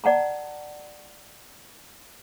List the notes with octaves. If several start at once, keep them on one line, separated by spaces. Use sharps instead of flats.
D5 F#5 A5 A#5